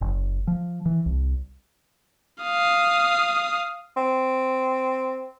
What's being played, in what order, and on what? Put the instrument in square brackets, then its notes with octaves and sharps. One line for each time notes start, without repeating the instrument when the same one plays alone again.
[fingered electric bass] F#1
F3
E3
C2
[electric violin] F5 D#6
[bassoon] C4